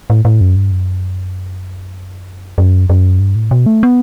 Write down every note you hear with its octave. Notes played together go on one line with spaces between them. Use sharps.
A2
A2
F#2
G2
F#2
F#2
F#2
G2
A2
B2
A3
B3